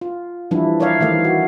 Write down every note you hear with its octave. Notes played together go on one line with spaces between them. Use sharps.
F4
E3 F3 G3 D4 E4
A#4 C#5 D5 E5 F5
D#3 E3 A3 F5
F#4